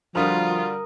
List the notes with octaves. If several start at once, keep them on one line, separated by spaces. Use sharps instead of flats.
D3 F3 G3 F4 F#4 A#4 D#6